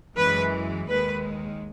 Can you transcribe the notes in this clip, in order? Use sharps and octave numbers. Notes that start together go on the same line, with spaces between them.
F#2 E3 G#3 B4
D#2 D#3 G#3 B4